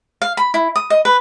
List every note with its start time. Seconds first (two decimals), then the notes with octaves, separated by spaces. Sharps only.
0.22 F5
0.37 B5
0.54 E4
0.76 D#6
0.90 D#5
1.05 B4